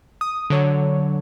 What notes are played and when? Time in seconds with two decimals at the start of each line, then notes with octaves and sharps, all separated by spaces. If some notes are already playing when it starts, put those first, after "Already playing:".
0.21 D#6
0.50 D3 F#3 C#5